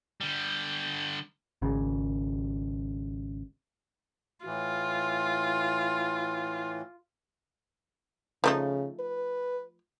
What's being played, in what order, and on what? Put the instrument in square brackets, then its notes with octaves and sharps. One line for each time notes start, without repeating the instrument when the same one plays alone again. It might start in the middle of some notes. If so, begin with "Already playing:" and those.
[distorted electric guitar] D3 G3
[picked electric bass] G#1 C#3
[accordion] A2 E3 [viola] F4
[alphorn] C#3 [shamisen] F3 A3 D#4
[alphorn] B4